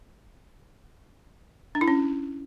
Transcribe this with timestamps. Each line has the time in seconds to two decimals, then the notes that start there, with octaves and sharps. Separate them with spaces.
1.75 D4
1.81 E4
1.88 C#4